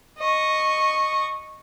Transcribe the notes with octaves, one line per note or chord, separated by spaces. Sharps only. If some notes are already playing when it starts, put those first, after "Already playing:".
D#5 C#6